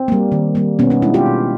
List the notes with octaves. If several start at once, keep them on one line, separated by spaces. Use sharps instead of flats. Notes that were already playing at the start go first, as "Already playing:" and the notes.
Already playing: C4
G3 A#3
D#3
G3 A#3
B2 B3 C#4
C#4 D#4
G#3 D4 E4
F4 G4
B2